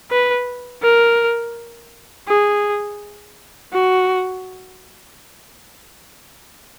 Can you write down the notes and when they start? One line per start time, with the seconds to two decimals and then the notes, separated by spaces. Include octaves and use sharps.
0.11 B4
0.83 A#4
2.28 G#4
3.73 F#4